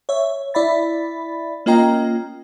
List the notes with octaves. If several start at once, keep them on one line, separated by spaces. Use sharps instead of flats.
C#5 E5
E4 D5 E5 B5 A6
A#3 C#4 F4 D#5 G5 A#5